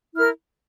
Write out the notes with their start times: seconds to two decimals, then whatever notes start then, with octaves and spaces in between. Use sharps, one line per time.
0.15 E4 A#4 F6